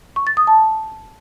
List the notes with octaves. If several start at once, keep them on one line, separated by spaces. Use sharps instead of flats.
C#6
A6
D#6
A5